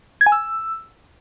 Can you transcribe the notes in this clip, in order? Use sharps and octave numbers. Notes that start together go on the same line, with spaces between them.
G#6
G#5
E6